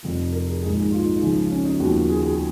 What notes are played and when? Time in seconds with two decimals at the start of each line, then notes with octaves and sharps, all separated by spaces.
0.03 F1 F2 F3
0.32 A#4
0.47 G#4
0.62 A#1 G#2 D#3 G#4
0.77 G#4
0.92 F4
1.06 D#4
1.20 C#2 C#3 F3
1.51 C#4
1.65 D#4
1.80 D#2 C#3 F3 F#4
2.09 G#4
2.25 G#4